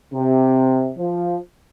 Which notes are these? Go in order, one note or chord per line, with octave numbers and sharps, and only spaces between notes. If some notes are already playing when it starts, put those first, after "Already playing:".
C3
F3